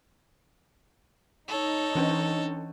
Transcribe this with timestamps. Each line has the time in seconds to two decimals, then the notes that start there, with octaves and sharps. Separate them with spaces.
1.48 D#4 A4 C#5
1.95 E3 C#4 D4